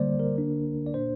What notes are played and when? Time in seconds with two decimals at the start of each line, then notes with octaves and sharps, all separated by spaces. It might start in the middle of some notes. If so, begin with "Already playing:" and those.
Already playing: D3 G3 A#3 C5 D5
0.20 A#4
0.34 D3 A#3 D4
0.86 D5
0.94 A#2 A#3 D4 C5